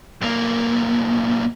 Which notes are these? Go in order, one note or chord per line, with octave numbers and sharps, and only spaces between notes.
B1 A#3